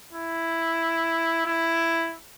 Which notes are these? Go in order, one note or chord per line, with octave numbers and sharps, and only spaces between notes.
E4
E4